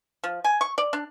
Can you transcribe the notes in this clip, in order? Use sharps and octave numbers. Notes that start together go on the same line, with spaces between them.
F3
G#5
C#6
D5
D4